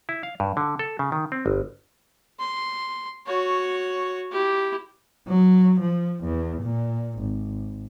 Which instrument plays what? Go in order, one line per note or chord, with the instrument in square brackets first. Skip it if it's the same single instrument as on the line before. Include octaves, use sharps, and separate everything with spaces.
[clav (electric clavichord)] E4
F5
G2
D3
A4
C#3
D#3
C4
G1
[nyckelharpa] C6
F#4 C#5
E4 G4
[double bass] F#3
F3
E2
A#2
G#1